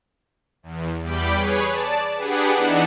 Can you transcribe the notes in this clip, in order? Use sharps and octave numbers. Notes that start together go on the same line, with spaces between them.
E2
E2 G3 B5 D6 G6 D7
G#4 B4 C#5
D5 A5
D4 G4 G#4 B4 F#5
E3 B3 D4 D#4 F#5 E7